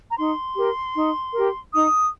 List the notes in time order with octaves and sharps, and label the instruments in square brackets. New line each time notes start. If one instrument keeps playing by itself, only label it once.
[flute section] A#5
D#4 C6
G4 A#4
D#4
G4 A#4
D#4 D#6